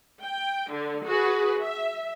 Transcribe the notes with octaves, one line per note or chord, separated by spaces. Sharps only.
G5
D3
F#4 G#4 B4
E5